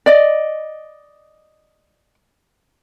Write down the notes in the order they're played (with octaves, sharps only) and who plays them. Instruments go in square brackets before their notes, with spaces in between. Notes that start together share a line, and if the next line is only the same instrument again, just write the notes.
[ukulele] D5 D#5